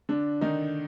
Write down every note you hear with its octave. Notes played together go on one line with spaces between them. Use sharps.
D3 D4
D#3 D#4